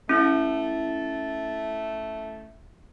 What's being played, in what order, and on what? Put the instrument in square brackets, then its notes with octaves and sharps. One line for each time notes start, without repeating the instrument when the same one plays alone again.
[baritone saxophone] A3 [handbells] C#4 E4